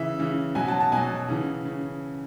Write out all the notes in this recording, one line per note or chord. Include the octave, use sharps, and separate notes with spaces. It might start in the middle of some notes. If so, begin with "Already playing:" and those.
Already playing: C#3 E3 E5
C#3 E3
B2 F#3 G#5
A5
A5
B2 F#3 G#5
C#3 E3
C#3